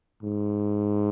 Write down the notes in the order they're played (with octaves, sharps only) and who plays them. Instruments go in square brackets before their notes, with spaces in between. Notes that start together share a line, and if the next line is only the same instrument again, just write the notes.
[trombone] G#2